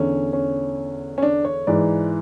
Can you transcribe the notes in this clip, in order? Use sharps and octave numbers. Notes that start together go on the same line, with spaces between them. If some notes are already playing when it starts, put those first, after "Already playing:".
Already playing: E2 D3 C#4
C#4
C#4
D4
C#5
G#2 E3 D5